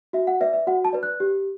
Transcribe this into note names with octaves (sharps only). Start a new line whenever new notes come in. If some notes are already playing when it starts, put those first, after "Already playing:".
F#4 E5
F#5
B4 D5 E5
E5
F#4 F#5
A5
B4 D5
F#6
G4